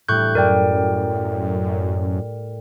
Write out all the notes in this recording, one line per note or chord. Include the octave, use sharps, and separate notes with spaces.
A2 G3 C#6 F#6 G6
F#2 A#4 D5 G5